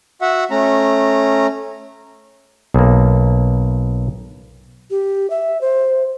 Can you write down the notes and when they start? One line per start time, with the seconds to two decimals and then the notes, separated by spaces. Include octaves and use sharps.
0.21 F#4 E5 F#5
0.51 A3 C#4 A#5
2.74 B1 A#3
4.91 G4
5.30 E5
5.61 C5